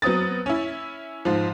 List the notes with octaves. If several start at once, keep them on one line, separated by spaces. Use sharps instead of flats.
F#3 B3 C4 D#6 A6
C#4 E4
G#2 F3